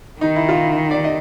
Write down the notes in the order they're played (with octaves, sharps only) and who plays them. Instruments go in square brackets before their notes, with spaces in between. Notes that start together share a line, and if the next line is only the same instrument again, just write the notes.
[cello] D#3 [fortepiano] D#4
[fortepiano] E4
F4
E4
D5
D#5